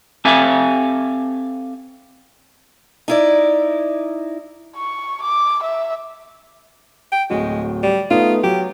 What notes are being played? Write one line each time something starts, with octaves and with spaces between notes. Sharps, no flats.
C4 G4 A4 E5 F5 G#5
D#4 E4 D5
C#6
D6
E5
G5
D1 G#3 F#4
G3
A3 B3 D#4 F4
F#3 G4